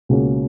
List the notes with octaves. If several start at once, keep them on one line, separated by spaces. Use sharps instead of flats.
C#2 B2 A#3 C#4